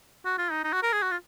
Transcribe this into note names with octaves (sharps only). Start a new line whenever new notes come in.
F#4
F4
D#4
D#4
F#4
A#4
G#4
F#4
F4